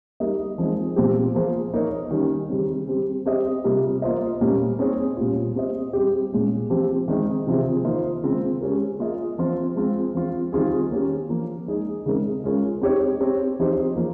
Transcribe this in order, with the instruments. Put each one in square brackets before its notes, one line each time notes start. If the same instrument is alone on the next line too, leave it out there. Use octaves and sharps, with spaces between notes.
[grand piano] G3 A#3 D#4 A#4 D#5
F3 G#3 C4 D#4 G#4
A#2 F3 C4 G4
F3 A#3 F4 G#4 C5
A#3 D#4 A#4 C#5
D#3 G3 C#4
C#3 G3 C4
G3 C4 G4
C4 G4 C5 D#5
C3 G3 A#3 F4
A#3 F4 C5 D#5
A#2 G3 A#3 C#4
C4 D#4 G#4 C#5
A#2 G3 C#4 F4
C4 G4 C5 D#5
G3 C4 G4
A#2 G#3 C#4
F3 C4 G4
D#3 G#3 C4 D#4
C3 F3 C4 F4 G#4
D#3 A#3 F4 C5 D#5
C#3 G#3 C4 F4
G#3 C#4 G4 A#4
A#3 F4 G#4 D#5
F3 C4 F4 C5
G#3 C4 F4
F3 C4 F4
D#3 G3 C4 F4 G#4
A#3 C#4 G4
F3 A#3 F4
G#3 D#4 G#4
C#3 G#3 C4 D#4 A#4
G#3 C#4 F4 A#4
C4 D#4 G4 C#5
C4 G4 C#5
F3 C4 D#4 G4 C5
F3 A#3 F4 G#4